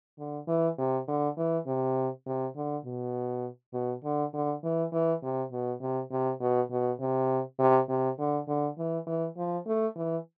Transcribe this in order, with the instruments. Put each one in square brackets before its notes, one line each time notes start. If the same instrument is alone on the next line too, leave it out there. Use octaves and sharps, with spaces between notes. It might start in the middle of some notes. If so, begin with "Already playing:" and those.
[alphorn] D3
E3
C3
D3
E3
C3
C3
D3
B2
B2
D3
D3
E3
E3
C3
B2
C3
C3
B2
B2
C3
C3
C3
D3
D3
E3
E3
F3
A3
E3